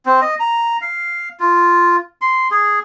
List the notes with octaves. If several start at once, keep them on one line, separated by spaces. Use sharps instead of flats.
C4
D#5
A#5
F5
F4
C6
G#4